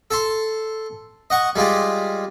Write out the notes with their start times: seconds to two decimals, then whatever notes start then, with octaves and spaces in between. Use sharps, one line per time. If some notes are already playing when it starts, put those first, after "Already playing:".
0.11 A4 A5 C6
1.30 D#5 F#5 C#6
1.56 G3 G#3 F4 G4